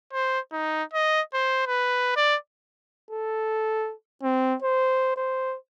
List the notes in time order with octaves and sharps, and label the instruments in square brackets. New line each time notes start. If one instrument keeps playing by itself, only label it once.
[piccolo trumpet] C5
D#4
D#5
C5
B4
D5
[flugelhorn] A4
C4
C5
C5